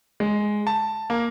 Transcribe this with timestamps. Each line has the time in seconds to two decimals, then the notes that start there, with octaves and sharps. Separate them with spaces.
0.20 G#3
0.67 A5
1.10 A#3